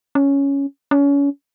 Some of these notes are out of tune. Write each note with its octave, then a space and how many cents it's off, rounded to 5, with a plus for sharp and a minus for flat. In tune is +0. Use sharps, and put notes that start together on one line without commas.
C#4 +5
C#4 +30